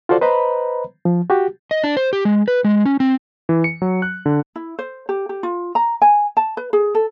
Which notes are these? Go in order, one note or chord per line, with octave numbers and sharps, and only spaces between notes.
F4 F#4 A4 C5 D5
B4 C5 D#5 A#5 B5
F3
F#4 G4
D#5
D4
C5
G4
G#3
B4
G#3
C#4
C4
E3
C#7
F#3
F#6
D3
E4
C5
G4
G4
F4
A#5
G#5
A5
B4
G#4
A4